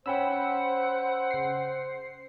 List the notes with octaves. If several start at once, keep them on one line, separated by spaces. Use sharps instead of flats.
C#4 C5 F#5 G5 B5 E6
C#3 C7